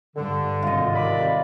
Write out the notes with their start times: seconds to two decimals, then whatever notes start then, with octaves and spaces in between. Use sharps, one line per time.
0.16 G2 D3
0.62 G#1 C3 F4 D#5
0.94 D#2 D5 B5